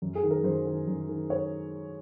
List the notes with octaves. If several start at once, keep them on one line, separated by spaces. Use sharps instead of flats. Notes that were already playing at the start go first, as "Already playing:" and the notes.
F#2
G#4
D#3
A#4
F#2 C5
D#3
F#2
D#3
C#5